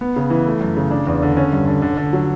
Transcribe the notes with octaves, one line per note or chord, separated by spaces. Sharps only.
B3
C#3
E3
A3
F#2
C#3
D4
E2
D3
C#4
G2
D3
D3
D3
F#3